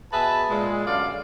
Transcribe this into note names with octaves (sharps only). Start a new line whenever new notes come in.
B2 B3 G#4 B4 E5 A5
A#2 G#3
F#2 D3 A3 D5 F5